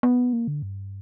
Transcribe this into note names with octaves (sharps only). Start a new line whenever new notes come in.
B3
A#3
D3
G2